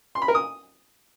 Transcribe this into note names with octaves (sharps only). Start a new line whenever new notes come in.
C6
B5
A#4
D#6